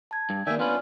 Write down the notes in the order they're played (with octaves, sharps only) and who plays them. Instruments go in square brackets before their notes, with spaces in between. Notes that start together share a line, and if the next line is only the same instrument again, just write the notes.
[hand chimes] A5 G#6
[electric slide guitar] G2
[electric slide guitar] D#3 A#3 [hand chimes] D5 [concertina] E5 G5 G#5
[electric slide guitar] B3 D4 B4 [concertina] C#4 F4